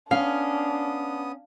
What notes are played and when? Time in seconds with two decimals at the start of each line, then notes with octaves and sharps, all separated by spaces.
0.11 B3 C#4 D4 F5 D#6